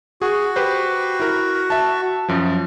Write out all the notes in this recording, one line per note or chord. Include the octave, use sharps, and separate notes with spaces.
F#4 G#4
G4 B4 C5
E4 A#4
E5 A5
F#2 F3